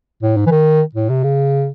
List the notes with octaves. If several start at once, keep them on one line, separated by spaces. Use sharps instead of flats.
A2
G#2
E3
D#3
A2
C3
C#3